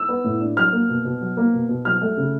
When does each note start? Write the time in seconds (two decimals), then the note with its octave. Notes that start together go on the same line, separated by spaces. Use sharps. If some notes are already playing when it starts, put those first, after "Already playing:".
Already playing: E6
0.09 B3
0.24 A2
0.41 D4
0.57 F#3 F6
0.72 A#3
0.89 B2
1.05 B2
1.21 F#3
1.37 A#3
1.53 B2
1.69 B2
1.85 F#3 F6
2.01 A3
2.17 C#3